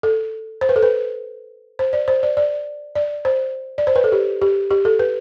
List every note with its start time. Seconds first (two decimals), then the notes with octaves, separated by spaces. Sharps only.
0.03 A4
0.61 C5
0.69 B4
0.76 A4
0.83 B4
1.79 C5
1.93 D5
2.08 C5
2.23 D5
2.37 D5
2.95 D5
3.25 C5
3.78 D5
3.87 C5
3.96 B4
4.04 A4
4.12 G4
4.42 G4
4.71 G4
4.85 A4
4.99 B4